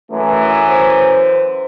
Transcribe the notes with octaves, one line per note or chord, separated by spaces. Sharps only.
F#2 E3 A3
C5